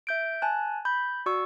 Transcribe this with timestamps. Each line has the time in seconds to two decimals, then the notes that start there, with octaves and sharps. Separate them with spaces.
0.07 E5 G6 D7
0.42 G#5 A5 F#6
0.85 B5 G6 B6
1.26 F#4 D5 C#6 E6